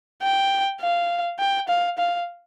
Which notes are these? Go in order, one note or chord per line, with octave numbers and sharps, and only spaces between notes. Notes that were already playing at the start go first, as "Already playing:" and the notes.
G5
F5
G5
F5
F5